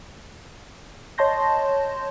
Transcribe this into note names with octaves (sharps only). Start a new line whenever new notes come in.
C#5 D#5 A5 C6 G6 A#6